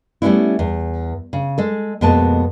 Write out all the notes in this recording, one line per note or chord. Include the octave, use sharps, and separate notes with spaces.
G3 A3 B3 C#4 D4 E4
E2
C#3
G#3 A4
F2 B2 G#3 A#3 B3 A5